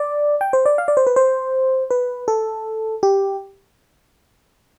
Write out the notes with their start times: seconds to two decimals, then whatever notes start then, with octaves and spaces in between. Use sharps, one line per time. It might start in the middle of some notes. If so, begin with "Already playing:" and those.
Already playing: D5
0.41 G5
0.53 C5
0.66 D5
0.78 F5
0.88 D5
0.97 C5
1.07 B4
1.16 C5
1.91 B4
2.28 A4
3.03 G4